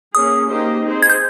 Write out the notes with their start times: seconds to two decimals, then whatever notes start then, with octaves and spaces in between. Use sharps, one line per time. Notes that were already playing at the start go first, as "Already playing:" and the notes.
0.15 A#3 C#4 G#4 D#6
0.49 A#3 D#4 G4 C5 D#5
0.84 C4 D#4 G#4 C5
1.02 G#6
1.09 G6